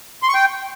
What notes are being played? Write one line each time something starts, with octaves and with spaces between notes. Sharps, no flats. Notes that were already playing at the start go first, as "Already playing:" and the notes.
C6
C#6
G5